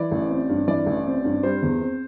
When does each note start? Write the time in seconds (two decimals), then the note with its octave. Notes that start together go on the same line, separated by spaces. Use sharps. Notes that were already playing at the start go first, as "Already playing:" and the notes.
Already playing: E3 D5
0.11 A1
0.30 C4
0.49 G2
0.67 E3 D5
0.86 A1
1.06 C4
1.25 G2
1.43 G3 C5
1.62 E2
1.81 C4